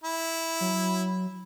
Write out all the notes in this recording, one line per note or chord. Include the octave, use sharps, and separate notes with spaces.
E4
F#3